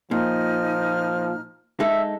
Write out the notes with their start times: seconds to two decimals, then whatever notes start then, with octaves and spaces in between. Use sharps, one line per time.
0.11 A#2 F3 D#4 F6
1.80 G#3 D#4 A4 E5